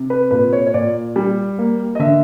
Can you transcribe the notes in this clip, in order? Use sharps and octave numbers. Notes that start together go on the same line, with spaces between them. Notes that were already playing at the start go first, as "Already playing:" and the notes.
Already playing: C3
B4
A#2 B4
C#5
C#5
A#2 D5
G3
A#3
D#5
D3 E5